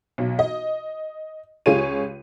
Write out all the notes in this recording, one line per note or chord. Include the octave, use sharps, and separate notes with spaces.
B1
D#5
C#2 F4 G4 G#4 C#5 D#7